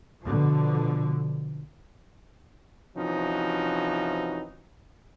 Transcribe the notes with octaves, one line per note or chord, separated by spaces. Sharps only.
B2 D3 F3
C3 E3 F3 C#4 D#4 F#4